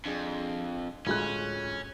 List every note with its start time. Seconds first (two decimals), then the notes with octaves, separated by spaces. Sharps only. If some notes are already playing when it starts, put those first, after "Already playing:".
0.05 F2 D4 G#4
1.07 D2 A2 G#3 C#4 F4 F#6